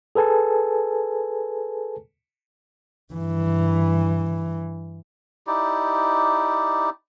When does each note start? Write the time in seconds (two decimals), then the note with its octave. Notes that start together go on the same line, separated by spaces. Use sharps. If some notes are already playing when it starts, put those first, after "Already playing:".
0.15 G#4 A4 B4 G#5 A5
3.13 G2 E3
5.47 D#4 E4 G4 D5